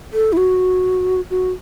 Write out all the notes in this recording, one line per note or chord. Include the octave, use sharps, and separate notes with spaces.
A4
E4
F#4
F#4